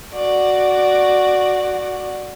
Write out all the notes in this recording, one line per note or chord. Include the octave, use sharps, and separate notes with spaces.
F#4 D5